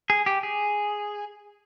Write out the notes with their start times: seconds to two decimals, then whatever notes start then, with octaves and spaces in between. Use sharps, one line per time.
0.10 G#4
0.26 G4
0.43 G#4